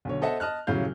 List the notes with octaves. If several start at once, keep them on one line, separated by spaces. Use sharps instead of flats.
B1 D3 C#5
A4 C5 D#5 E5 F#5 A5
D#5 A5 F6 F#6
D#1 C#3 F#3 E4 F5 G6